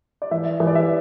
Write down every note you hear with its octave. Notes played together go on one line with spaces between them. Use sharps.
D5
E3 E5
E3
D5
E5